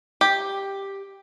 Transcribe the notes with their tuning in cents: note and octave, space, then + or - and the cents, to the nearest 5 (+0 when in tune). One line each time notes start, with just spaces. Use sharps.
G4 +5